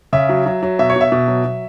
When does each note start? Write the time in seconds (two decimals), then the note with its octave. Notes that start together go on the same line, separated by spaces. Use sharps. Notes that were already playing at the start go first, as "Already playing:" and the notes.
0.13 C#3 E5
0.29 F#3
0.46 F#3
0.63 F#3
0.79 B2 E5
0.90 C#5
0.96 B2 E5
1.12 B2
1.28 F#3
1.45 F#3